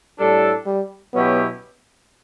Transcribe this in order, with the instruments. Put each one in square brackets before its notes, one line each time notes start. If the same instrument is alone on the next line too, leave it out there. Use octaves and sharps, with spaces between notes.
[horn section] A2 G3 D4 A4
[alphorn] G3
[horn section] B2 F#3 C#4 E4 G4 [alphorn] B3